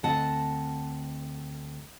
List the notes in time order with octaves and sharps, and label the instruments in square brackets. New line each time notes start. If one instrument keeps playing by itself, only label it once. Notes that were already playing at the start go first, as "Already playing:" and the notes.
[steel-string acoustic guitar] D2 C4 D#5 F#5 A5